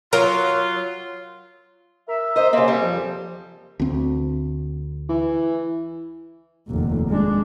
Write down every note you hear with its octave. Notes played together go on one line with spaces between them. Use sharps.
F#3 F4 A#4
A#4 E5
C5 D#5
C#3 A#3 C4
G3
F2 F3
D2 C4
E3
F1 D#2
G#3 D4